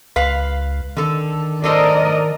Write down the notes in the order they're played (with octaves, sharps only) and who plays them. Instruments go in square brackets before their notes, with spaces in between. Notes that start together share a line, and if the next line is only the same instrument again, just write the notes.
[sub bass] C#2 [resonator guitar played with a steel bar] B4 F5
[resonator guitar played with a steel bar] D3 A4 [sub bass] D#3
[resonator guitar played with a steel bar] D4 A4 C5 [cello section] A#4 D5 D#5